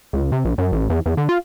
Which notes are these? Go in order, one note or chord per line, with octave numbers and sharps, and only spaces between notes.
C#2
C3
A#1
F#2
A1
E2
E2
D3
F4